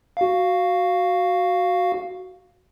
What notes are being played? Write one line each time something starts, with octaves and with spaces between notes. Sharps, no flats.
F#4 F5